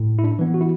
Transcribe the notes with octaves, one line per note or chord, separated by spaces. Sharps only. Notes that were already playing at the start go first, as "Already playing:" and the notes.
Already playing: A2
E4
D4
E3 B3
F#4
E4